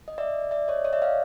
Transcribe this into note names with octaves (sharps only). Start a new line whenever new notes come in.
D#5
D5 E5
D5 E5
C#5 D#5
C#5 D#5
D5 E5
D#5 F5